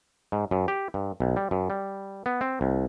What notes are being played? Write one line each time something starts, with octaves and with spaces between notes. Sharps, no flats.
G#2
F#2
G4
G2
B1
G3
F#2
G3
B3
C4
C2